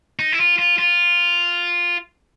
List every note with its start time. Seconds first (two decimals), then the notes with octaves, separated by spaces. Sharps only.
0.19 D#4
0.32 E4
0.39 F4
0.58 F4
0.79 F4